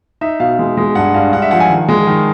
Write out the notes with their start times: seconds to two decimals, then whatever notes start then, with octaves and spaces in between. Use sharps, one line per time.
0.21 D#4 E5
0.40 B2 F5
0.59 G#3
0.77 G#3
0.95 G2 F#5
1.14 G2 F5
1.33 G2 F#5
1.42 E5
1.51 F3 F#5
1.60 G#5
1.70 D#3
1.89 G#3
2.07 D#3